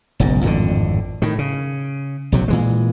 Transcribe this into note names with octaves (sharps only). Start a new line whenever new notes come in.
F#1 B1 G#2
G#1 F2 A2 D3
A2 D#3
C#3
A#1 C3 F#3
A#2 E3 G#3